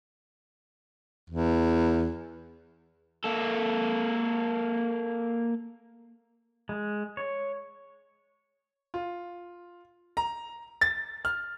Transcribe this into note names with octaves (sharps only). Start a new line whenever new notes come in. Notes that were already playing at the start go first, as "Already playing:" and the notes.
E2
A#3 A4
G#3
C#5
F4
A#5
A6
F6